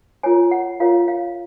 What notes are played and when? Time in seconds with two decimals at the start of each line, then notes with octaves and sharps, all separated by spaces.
0.23 F4 A#4 C#5 G#5
0.51 F#5
0.80 F4 A#4 C#5 F5
1.08 F5